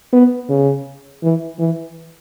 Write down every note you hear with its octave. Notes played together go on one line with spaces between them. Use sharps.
B3
C#3
E3
E3